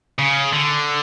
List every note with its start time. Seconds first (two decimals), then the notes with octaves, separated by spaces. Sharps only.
0.19 C#3
0.53 D3